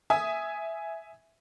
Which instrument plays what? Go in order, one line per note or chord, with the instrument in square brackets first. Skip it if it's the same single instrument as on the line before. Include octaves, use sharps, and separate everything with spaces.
[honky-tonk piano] E5 G#5 D#6